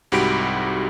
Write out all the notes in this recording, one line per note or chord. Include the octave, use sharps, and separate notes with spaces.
C2 G#2 F#4 G4 B5 D7